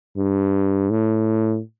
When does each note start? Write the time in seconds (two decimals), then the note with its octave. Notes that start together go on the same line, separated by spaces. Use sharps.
0.17 G2
0.90 A2